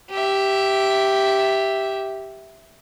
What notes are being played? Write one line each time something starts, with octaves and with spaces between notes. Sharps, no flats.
G4 E5